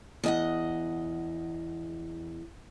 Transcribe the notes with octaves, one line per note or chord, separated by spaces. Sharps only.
E2 D#5 F#5